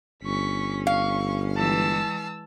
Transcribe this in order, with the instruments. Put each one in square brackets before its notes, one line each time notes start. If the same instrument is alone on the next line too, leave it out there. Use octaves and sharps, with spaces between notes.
[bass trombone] G1 [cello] C#4 [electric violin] C#6 B6
[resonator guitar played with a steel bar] F5 [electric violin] C#6
[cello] E3 G#3 [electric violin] A5 E6